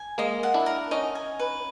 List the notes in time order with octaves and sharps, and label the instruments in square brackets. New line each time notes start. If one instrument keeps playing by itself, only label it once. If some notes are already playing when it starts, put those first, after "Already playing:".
Already playing: [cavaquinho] G#5
[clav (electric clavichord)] G#3 A#3 [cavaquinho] D#5
[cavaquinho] F#5
[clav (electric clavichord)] D4 E4
[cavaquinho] A#4
[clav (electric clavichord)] C#4 D#4 [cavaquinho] D#5
[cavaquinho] G#5
B4